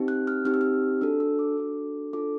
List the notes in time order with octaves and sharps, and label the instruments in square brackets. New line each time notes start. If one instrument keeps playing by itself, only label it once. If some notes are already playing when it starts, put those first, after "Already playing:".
Already playing: [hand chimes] C4 D#4 G4
F#6
F6
C4 D#4 G4 F6
E6
F6
D4 F#4 A4 E6
E6
D6
D4 F#4 A4
D4 F4 A4 D6